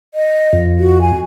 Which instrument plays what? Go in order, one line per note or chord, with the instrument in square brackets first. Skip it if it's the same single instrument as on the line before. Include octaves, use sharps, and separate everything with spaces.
[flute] D#5
[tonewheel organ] F2
[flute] F#4
G#5